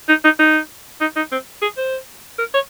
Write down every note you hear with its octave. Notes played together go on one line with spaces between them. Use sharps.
D#4
D#4
D#4
D#4
D#4
C4
G#4
C5
A#4
C#5